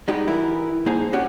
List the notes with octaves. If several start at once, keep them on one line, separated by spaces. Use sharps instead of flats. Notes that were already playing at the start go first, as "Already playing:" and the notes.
G3 G#3 D#4 F#4 G4
E3 E4 A#4
G#2 A#3 D#4 G#4 C5 A5
C#4 D4 F#4 G4